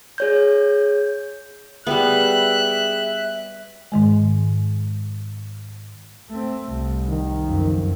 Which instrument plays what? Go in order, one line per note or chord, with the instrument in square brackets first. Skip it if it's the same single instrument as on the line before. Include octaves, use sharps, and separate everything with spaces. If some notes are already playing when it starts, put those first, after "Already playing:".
[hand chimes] G#4 C#5 G6
[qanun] G3 B3 [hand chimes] G#4 G5 [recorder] E5 [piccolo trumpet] F#6
[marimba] G#2 D#3 G#3
[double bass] A3 C4
C2
[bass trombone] D#3
[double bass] F#1 F2